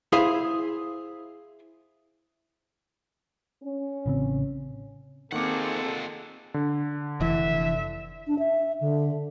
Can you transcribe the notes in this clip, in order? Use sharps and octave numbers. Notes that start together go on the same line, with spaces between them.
E4 G#4 C5 F5
C#4
A1 C#3 C4
F2 D#3 A#3 C4 G#4 A4 F#5 D6
D3
F1 E3 E5
D4
E5
D3